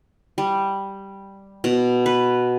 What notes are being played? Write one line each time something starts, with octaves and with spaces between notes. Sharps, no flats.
G3
B2
B4